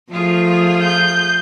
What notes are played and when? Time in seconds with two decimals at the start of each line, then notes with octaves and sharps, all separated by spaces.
0.11 F3 A3 F4 G#4
0.82 G6